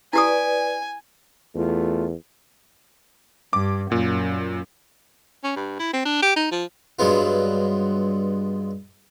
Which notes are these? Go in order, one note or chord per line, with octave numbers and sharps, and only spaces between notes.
E4 G4 B4 D5 G#5 D#6
E2 A3 F4
G2 D6
F#2 A#2
C#4
G2
E4
C4
D4
G4
D#4
F3
G2 F#3 G#3 B3 F4